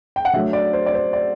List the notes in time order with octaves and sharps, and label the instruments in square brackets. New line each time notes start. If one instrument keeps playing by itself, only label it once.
[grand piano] G5
F#5
D3 F#3 A3 E5
D5
C5
D5
C5
D5